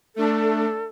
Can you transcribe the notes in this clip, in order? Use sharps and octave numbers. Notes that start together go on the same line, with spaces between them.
A3 D4 A4